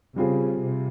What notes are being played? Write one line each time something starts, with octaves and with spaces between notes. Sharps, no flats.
C#3 G3 C4 F4 G#4
C3